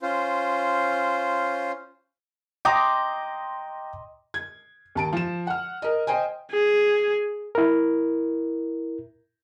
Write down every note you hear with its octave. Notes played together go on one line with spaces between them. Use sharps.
C#4 F4 C5
D#5 G5 A#5 C6 D6
G#6
D#2 A5 D7
F3 E7
F#5 F6
A#4 D#5
C5 D#5 G5 G#5
G#4
E4 A#4